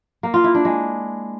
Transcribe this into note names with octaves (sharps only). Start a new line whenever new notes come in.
A#3
F4
E4
D4
G#3